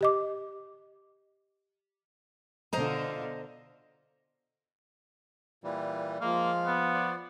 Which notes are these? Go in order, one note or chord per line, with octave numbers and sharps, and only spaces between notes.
G4 D#5 D6
B2 D3 F4 C5 D#5 A#5
A#2 E3 G3
F3 G#3 A#3 F5
B3
C5 D5